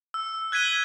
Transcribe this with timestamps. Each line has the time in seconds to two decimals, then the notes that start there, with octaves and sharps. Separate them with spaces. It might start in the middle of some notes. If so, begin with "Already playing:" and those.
0.14 E6
0.52 F#6 G#6 B6 D#7 G7
0.65 F#7